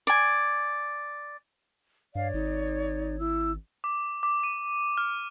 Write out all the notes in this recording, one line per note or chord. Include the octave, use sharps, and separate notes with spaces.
D5 G#5
G2 C#5 D5 F5
G#1 D#4
E4 E6
D6
D6
D#7
F6